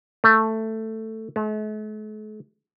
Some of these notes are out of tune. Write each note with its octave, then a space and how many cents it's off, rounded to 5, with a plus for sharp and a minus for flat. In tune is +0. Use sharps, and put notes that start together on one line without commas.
A3 +10
A3 -45